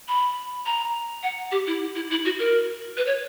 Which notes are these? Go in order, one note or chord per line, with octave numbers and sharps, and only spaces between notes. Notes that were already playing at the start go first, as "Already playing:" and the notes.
B5
A#5
F#5
G4
E4
E4
E4
F#4
A#4
B4
C#5